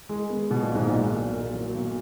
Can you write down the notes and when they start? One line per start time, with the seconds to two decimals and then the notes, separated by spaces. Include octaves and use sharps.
0.09 G#3
0.30 B3
0.51 B2 F#3
0.63 A#2
0.71 B1 G#2
0.87 A#2
0.92 B1
1.13 F#3
1.33 A#3
1.54 F#3
1.75 B1